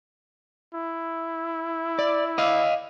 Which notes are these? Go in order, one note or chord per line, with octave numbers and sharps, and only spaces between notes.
E4
D5
D#5 F5